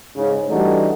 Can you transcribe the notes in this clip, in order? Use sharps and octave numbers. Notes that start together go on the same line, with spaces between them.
G#2 C#3
E3 G3 A3 D4 D#4 F#4